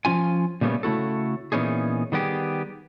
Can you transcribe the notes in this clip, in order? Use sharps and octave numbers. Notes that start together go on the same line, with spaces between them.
F3 C#4 F4 G#5
A#2 C#3 G3 A3 B3 C#4
C#3 A3 E4 F#4 A4
A#2 E3 B3 C#4 D#4 G#4
D#3 G3 B3 G4 G#4